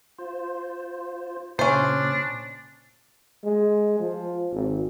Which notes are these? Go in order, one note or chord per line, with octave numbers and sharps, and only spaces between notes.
F4 C5
A#2 C#3 C#4 D4 C5
G#3
F3
G#1